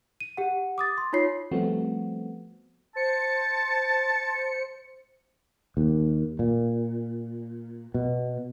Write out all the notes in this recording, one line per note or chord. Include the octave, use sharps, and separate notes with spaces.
D#7
G4 F#5
D6 D#6 A6
C6
D#4 F4 C#5 C7
F3 G3 A3 B3 C4 F#4
C5 A5 C#7
D#2
A#2
B2